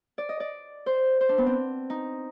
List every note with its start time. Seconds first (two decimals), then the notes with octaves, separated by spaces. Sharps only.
0.18 D5
0.29 D#5
0.40 D5
0.86 C5
1.21 C5
1.29 D4
1.38 B3
1.47 C4
1.90 D#4